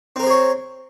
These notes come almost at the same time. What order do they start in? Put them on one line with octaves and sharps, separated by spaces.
C4 A#4 C5 G#4 C#5